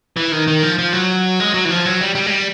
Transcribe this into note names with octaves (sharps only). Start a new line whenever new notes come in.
E3
D#3
D#3
F3
F3
F#3
G#3
F#3
E3
F3
F#3
G3
G3
G#3
G3